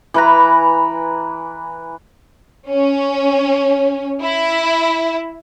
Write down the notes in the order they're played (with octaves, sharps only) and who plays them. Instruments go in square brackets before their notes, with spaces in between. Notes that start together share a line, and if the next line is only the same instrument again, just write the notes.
[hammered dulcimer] E3 B4 A#5
[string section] C#4
E4